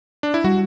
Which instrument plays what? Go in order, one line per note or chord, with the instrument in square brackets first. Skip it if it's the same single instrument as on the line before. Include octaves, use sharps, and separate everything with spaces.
[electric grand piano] D4
E4
[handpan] G3 [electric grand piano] F#4